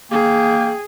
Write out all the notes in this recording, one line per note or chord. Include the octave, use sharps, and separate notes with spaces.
A#3 G#4 G5